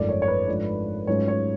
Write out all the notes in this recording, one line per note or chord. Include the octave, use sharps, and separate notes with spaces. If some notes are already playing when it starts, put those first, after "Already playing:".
Already playing: G#1 F#2 F3 A3 D5
C#5
C#5
B4
G#2 F3 A3 D4
G#2 F#3 A3 C#4 F4 C#5
C#5